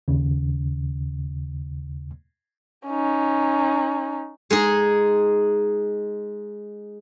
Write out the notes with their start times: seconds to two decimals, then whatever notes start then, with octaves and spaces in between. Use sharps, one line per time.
0.08 D#2 C#3
2.87 C#4 D#4
4.50 G#3 D#4 G#4